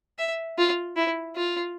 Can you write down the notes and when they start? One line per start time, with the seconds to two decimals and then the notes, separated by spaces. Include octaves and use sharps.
0.18 E5
0.58 F4
0.96 E4
1.36 F4